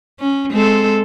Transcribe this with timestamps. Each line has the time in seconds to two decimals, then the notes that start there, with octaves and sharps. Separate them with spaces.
0.20 C#4
0.52 G#3 C4 A4